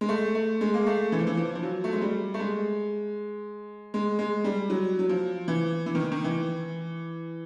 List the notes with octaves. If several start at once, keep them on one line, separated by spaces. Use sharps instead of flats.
G#3
A3
A3
G#3
A#3
A3
E3
F3
E3
F3
F3
F#3
A3
G#3
G3
A3
G#3
G#3
G#3
G3
F#3
F#3
F3
E3
E3
D#3
D#3
E3